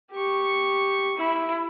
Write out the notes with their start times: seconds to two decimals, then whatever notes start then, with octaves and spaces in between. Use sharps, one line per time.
0.11 G4 C#6
1.16 E4